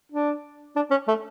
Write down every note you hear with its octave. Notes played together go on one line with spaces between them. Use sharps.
D4
D4
C#4
A3